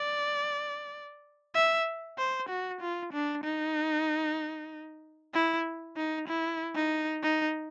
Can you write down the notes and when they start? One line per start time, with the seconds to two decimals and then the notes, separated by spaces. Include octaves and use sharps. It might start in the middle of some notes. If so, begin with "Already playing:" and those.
Already playing: D5
1.55 E5
2.18 C5
2.50 F#4
2.81 F4
3.13 D4
3.44 D#4
5.34 E4
5.97 D#4
6.28 E4
6.76 D#4
7.23 D#4